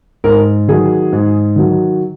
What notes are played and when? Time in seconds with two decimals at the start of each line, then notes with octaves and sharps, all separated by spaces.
0.24 G#2 A#4
0.68 D#3 F#3 G#4
1.13 G#2
1.56 D#3 F#3